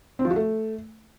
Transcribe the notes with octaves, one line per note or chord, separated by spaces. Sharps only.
C4
F3
F#4
A3